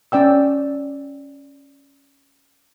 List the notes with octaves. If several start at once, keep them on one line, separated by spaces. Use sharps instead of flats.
C#4 D5 G5 E6